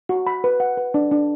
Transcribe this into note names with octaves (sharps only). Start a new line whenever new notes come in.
F#4
B5
B4
F#5
B4
D4
D4